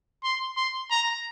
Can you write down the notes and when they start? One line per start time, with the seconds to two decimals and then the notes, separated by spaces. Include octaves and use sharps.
0.24 C6
0.57 C6
0.91 A#5